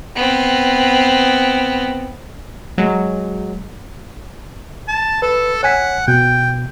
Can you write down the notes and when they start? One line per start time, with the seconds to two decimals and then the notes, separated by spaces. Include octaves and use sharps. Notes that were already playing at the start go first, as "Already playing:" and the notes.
0.16 B3 C4
2.78 F#3 G#3
4.88 A5
5.22 A4 B4
5.63 C#5 F#5 G#5 B6
6.08 B2 G5